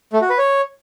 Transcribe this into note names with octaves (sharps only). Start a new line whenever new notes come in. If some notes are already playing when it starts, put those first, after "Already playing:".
A3
F#4
B4
C#5